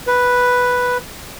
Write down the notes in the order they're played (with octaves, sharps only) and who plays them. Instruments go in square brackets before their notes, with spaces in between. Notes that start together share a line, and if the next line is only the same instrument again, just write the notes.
[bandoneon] B4